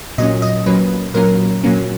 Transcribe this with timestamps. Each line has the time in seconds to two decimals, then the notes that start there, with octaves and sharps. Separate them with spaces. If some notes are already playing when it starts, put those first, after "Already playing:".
0.18 A#2 F#3 A#3 C#4 D#5
0.42 D#5
0.66 A#2 F#3 A#3 C#4 B4
1.14 A#2 F#3 A#3 C#4 A#4
1.63 A#2 F#3 A#3 C#4